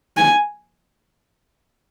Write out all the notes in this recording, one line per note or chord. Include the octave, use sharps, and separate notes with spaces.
G#5